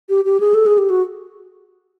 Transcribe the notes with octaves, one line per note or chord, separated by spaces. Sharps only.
G4
G4
G#4
A4
G#4
G4
F#4